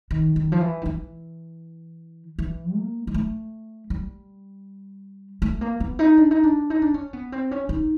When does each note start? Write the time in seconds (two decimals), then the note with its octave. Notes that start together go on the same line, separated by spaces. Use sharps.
0.11 D#3
0.36 D#3
0.52 F3
0.61 E3
0.82 D#3
0.86 E3
2.39 E3
2.75 A#3
3.07 G#3
3.14 A3
3.90 G3
5.42 A3
5.61 A#3
5.80 B3
5.99 D#4
6.17 D4
6.31 D#4
6.43 D4
6.70 D#4
6.82 D4
6.94 C#4
7.13 B3
7.32 C4
7.51 C#4
7.69 D#4